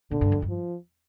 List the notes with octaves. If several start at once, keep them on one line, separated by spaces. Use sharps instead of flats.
A#2 D3
G2
F2
G2
F3